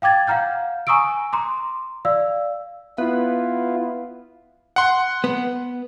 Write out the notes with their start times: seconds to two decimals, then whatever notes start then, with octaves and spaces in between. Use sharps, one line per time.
0.02 F5 G5 D6 G#6 A6
0.27 F5 F#5 A#5 F6 G6
0.87 G#5 A#5 C#6 D#6 E6 D7
1.33 A#5 C6 D6
2.05 D5 F5 E6
2.98 B3 E4 F4
4.76 F#5 C6
5.24 B3